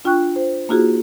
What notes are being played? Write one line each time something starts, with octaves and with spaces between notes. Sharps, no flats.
D4 F4 G5 C#6 F#6
C5
A#3 D#4 F4 F#4 G#4